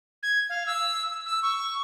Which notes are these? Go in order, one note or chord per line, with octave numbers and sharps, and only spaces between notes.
G#6
F5
E6
E6
C#6